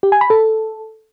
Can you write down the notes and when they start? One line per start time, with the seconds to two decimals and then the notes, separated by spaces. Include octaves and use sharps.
0.03 G4
0.12 G#5
0.21 B5
0.30 A4